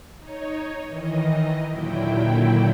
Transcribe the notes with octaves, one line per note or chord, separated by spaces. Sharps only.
D#4 C#5
D#3 E3 D#5
D#2 A#2 D3 F#3 E4 G5